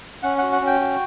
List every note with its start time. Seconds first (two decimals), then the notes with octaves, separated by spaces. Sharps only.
0.23 C#4 F#5
0.38 F#4 F#5
0.53 F#5
0.61 C#4
0.67 G5
0.80 F#4